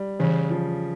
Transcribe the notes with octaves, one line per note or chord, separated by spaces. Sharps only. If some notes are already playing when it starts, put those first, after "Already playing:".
Already playing: G3
C#3 E3
F3